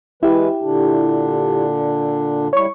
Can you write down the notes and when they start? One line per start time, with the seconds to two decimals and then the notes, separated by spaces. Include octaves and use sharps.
0.23 E3 G#3 E4 G4 B4
0.62 A#2 D3 D4
2.53 G3 E4 C#5 C#6